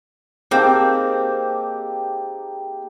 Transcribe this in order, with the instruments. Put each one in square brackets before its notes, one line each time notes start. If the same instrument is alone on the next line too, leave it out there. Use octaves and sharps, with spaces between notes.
[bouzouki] A#3 C4 [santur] D#4 G4 A5 [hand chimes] G#4 F5 G6